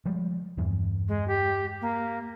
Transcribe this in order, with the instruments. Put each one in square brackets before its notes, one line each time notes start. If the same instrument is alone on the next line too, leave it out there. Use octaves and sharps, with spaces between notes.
[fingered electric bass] F3 G3 G#3
E2 G2 E3
[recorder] G#3
G4
A#3